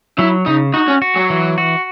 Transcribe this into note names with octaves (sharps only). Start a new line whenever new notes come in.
F#3 E4
C#3 D#4
D#4 F#4
C#4
F#4
F#3
E3
F#4